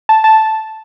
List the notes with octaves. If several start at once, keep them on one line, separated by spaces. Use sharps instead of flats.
A5
A5